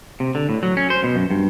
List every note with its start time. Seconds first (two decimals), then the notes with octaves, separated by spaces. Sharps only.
0.20 C3
0.35 D3
0.49 A2
0.63 F#3
0.77 C#4
0.90 C5
1.04 B2
1.16 F#2
1.31 G2